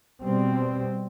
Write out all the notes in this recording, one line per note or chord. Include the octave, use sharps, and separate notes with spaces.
B2 G3 C4